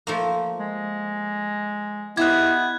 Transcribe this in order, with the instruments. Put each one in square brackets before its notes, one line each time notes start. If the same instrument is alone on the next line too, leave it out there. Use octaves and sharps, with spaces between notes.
[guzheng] F3 A3 A#3
[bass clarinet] G#3
[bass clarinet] B3 [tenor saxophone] E4 [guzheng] G4 C5 D#5 [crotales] F#6 G#6